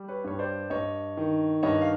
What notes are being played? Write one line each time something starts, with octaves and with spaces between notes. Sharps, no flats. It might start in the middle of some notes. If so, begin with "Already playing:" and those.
Already playing: G3
B4 C#5
G2 C#5
C5 D5
G2 C#5 D#5
D#3
G2 C#5 D#5
F5